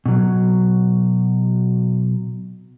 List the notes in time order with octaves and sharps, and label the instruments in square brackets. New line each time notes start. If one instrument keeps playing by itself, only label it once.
[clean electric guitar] B2 F#3